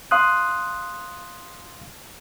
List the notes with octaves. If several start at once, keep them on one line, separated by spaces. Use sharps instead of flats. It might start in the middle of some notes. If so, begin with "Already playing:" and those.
F5 C6 D#6 F#6